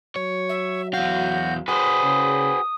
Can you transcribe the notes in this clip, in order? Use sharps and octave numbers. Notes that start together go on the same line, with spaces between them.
F#3 C#5
E5
E2 F#4 F5 G6
F#4 G#4 B4 C5 D#6
C#3